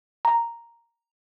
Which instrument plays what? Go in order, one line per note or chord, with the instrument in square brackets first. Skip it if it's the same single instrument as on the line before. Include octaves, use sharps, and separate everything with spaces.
[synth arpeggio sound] A#5